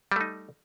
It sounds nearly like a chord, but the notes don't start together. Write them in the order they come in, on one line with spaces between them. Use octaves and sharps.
G3 A3 D#4